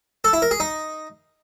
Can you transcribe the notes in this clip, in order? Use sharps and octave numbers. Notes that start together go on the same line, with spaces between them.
A4
E4
A#4
G#4
D#4